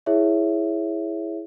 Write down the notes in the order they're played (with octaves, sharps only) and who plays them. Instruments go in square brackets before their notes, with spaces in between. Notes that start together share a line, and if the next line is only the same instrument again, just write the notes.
[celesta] E4 G#4 C#5 E5